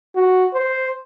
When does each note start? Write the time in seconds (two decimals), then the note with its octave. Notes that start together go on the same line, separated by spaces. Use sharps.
0.15 F#4
0.54 C5